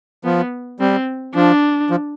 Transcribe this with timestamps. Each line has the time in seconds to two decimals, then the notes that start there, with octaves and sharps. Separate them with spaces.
0.25 F3 B3
0.80 G3 C4
1.35 F3 D4
1.90 F3